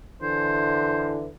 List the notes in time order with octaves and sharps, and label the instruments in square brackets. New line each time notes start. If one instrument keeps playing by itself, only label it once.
[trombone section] D3 E3 [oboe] C5